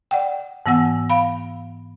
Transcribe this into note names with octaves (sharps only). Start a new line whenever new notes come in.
D5 F#5 G5
G#2 E3 B3 F#5 E6
F5 B5